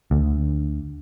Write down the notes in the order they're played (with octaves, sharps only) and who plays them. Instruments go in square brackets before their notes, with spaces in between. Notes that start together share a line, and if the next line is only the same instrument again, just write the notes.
[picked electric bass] D2